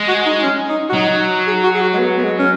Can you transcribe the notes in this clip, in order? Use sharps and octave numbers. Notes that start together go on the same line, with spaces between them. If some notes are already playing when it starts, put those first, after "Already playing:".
Already playing: G#3
F#4
D#4
C#4
D#4
F#4
F#3 D#4
G#4
F#4
G#4
F#4
G#3
B3
B3
G#3
C#4